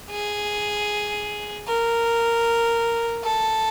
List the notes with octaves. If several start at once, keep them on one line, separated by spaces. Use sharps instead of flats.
G#4
A#4
A4